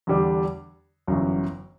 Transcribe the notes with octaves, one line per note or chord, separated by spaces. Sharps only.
E2 D3 G3 D4
G1 F#2 E3